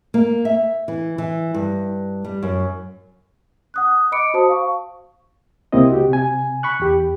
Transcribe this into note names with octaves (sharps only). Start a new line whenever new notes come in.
A#3
E5
E3
E3
G2
G3
F#2
F#5 D#6 F#6
D#5 B5 D6 C#7 D7
F#4 C5 A5 D#6
F5 C#6
C#2 C3 A#3 C4 E4 D#5
F#4 G4
C3 G#5
B5 C#6 F#6
E2 G4